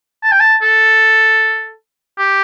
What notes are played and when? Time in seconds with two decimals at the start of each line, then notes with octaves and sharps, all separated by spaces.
0.23 A5
0.32 G5
0.40 A5
0.62 A4
2.19 G4